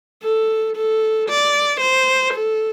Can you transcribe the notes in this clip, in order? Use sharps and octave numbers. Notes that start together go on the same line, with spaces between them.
A4
A4
D5
C5
A4